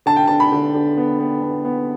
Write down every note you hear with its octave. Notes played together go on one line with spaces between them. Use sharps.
D3 A5
G5
D3 A5
B5
D3
D3
B3
B3
B3
B3